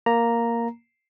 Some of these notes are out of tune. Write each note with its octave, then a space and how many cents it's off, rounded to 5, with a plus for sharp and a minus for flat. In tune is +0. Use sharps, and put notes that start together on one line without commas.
A#3 +0 A#5 +0